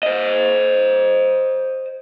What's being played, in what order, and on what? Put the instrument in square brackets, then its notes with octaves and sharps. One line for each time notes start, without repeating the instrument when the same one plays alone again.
[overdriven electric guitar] C5 D#5